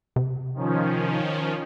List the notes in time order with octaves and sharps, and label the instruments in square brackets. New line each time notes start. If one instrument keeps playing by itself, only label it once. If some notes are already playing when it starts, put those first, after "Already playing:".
[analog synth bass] C3
[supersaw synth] D#3 F3 C#4